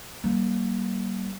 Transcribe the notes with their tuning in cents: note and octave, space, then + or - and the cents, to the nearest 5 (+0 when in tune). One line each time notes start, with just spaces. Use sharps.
G3 -35 A#3 +10